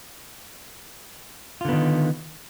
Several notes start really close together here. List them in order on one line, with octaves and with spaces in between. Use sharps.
F4 D3 B3 D#3